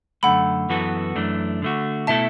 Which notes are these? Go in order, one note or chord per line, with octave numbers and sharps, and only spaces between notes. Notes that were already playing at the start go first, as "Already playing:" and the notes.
F#2 D3 A3 F#5 B5
F#2 E3 B3 F#4 A4
F#2 E3 A3 D4
D3 A3 F#4
B2 A3 E4 A4 E5 A5